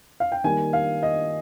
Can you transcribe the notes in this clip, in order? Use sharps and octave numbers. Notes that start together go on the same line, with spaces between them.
F5
G5
D#3 G3 A#3 G#5
F5
D#5